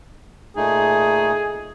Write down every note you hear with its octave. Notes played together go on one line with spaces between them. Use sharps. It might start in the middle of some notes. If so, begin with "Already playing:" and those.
A#2 A3 D#4 G#4